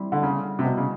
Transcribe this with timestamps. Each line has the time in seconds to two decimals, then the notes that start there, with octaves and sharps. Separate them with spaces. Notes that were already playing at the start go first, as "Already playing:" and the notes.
Already playing: G3 C4 E4
0.12 D3
0.23 C#3
0.59 C3
0.64 B2
0.77 C#3